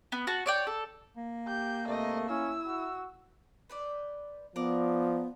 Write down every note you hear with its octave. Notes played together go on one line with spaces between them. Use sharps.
B3
F#4 A5
C#5 D5 G5
A4
A#3
G4 G6
G#2 C3 A3 A#4 D#5
C#4 E4 E6
F#4
B4 C5 D5
F3 B3 A#4 D5